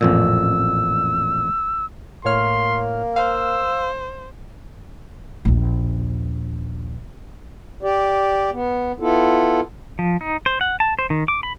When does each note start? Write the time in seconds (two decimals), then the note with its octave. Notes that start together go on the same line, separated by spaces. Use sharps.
0.01 A1 F2 A#2 E6
2.25 A2 A#3 C#5 C6 F6
3.16 C5 F5 E6
5.45 A#1 D#2
7.83 G4 D5
8.53 B3
9.00 B3 E4 F4 A4
9.99 F3
10.21 D#4
10.46 C5
10.61 F#5
10.80 A5
10.99 C5
11.10 D#3
11.28 D6
11.43 B5